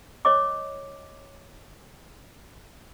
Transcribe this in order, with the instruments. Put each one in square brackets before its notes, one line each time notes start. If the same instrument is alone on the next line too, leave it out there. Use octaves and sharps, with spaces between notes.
[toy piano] C#5 D#5 D6